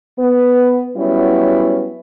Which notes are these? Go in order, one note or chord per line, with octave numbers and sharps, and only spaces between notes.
B3
F#3 G3 B3 C#4 E4